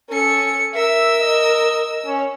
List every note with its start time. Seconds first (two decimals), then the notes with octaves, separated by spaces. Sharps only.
0.10 C#4 A4 C#7
0.74 A#4 E5 E6
1.21 D#5
2.06 C#4